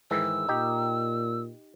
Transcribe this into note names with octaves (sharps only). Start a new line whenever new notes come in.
G#2 D#3 E3 E6
A#2 D#4 G4